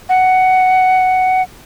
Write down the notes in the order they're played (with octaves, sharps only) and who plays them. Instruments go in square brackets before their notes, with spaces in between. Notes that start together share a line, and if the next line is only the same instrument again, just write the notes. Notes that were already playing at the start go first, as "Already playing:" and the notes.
[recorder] F#5